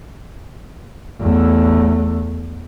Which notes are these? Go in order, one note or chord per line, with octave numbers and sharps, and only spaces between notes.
E2 A3